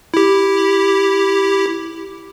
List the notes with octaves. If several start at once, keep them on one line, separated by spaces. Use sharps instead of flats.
E4 G4